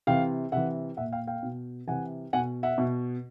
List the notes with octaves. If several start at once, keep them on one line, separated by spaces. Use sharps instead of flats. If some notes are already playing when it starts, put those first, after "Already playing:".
C3 E3 F5 G5
C3 E3 E5 F#5
A#2 E5 F#5
F5 G5
F5 G5
B2
C3 E3 F#5 G#5
B2 F#5 G#5
E5 F#5
B2